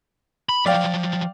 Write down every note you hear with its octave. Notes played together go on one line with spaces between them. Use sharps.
B5
F3 F#3 D5 F5 G5